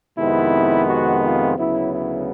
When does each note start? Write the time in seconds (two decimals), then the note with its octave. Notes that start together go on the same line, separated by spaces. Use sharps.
0.18 F2 C3 D#3 G#3 B3 E4
0.88 F#4
1.24 F4
1.57 D2 C#3 F#3 B3 E4
1.93 E4